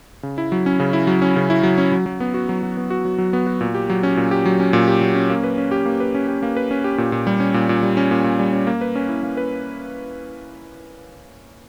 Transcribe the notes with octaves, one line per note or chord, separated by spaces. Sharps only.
C#3
E4
F#3
C#4
C#3
E4
F#3
C#4
C#3
E4
F#3
C#4
F#3
F#3
B3
F#4
F#3
F#3
B3
F#4
F#3
F#3
B3
F#4
A#2
G4
F#3
C#4
A#2
G4
F#3
C#4
A#2
G4
F#3
C#4
A#3
B4
C#4
G4
A#3
B4
C#4
G4
A#3
B4
C#4
G4
A#2
A#2
G3
C#4
A#2
A#2
G3
C#4
A#2
A#2
G3
C#4
A#3
B4
C#4
E4
A#3
B4